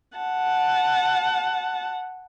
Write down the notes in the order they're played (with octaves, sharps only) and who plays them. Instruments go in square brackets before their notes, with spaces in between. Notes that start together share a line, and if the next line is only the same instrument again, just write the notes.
[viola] F#5 A5